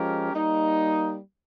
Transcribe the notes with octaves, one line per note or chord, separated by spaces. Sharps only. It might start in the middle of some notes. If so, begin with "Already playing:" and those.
Already playing: F3 G#3 C#4 G4 A#4
G3 A#3 D#4